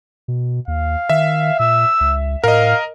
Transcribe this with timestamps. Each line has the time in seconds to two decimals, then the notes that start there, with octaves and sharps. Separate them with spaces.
0.28 B2
0.68 D#2 F5
1.10 D#3 E5
1.59 A#2 E6
2.01 C#2
2.44 A2 A#4 D#5 F5